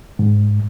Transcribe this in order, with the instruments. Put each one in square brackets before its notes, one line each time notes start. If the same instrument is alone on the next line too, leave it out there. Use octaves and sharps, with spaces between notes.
[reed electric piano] G#2